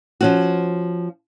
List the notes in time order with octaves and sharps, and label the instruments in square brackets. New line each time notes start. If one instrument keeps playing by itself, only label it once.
[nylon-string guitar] F3 C#4 F#4